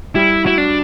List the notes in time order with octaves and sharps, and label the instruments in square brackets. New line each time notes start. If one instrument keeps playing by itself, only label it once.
[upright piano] G3 [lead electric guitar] E4
[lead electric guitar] E4 [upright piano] F#4
[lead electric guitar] D4